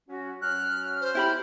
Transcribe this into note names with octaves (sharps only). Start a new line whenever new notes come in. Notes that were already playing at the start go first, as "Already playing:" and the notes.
F#3 C#4 F#4
F#3 C#4 F6 F#6
C5
E4 G4 B5